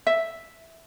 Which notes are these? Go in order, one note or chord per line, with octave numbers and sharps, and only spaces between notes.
E5